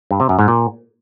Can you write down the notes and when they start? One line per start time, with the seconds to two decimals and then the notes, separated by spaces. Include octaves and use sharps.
0.11 G2
0.20 C3
0.29 F#2
0.39 G#2
0.48 A#2